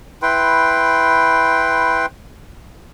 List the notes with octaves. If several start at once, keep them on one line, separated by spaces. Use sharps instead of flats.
E4 B4 G5 C6